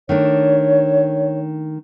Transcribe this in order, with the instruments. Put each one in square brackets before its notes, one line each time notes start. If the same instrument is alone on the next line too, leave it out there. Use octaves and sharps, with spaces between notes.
[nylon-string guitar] D#3 A3 D4 [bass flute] C#5